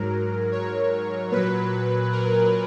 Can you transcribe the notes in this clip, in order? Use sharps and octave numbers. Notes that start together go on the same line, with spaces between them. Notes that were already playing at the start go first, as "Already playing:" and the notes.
Already playing: G#2 F#3 A#4
C#5
A#2 F#3 B4
A#4